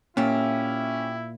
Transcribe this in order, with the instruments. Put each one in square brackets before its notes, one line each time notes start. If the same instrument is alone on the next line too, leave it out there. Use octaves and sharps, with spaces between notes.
[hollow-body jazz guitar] A#2 [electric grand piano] C#4 [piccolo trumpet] E4 [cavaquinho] G4 E5